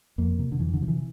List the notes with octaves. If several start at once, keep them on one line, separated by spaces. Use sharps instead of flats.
F2 A#3
C3
D3
F2 E3
D3
C3 F3
E3